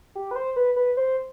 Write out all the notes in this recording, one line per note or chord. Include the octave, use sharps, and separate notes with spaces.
G4
B4
C5
B4
B4
C5